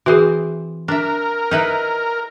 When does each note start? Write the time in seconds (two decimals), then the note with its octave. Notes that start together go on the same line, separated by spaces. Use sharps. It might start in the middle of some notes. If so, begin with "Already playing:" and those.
0.06 E3 C4 F#4 G#4 C5
0.88 D4 A#4 E5
1.51 D#4 E4 B4